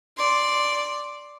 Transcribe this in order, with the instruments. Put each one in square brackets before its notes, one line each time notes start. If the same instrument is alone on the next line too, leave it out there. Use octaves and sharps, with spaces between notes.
[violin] D5 C6